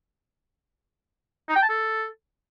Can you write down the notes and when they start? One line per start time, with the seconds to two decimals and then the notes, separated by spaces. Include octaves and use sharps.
1.49 D#4
1.56 G5
1.63 A5
1.69 A4